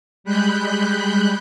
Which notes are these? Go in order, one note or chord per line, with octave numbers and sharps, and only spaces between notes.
G3 G#3 B5 F#6 G6